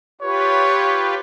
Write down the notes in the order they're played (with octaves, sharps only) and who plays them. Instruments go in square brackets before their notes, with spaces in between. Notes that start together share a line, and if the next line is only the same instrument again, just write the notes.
[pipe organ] F4 G4 B4 [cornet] C#5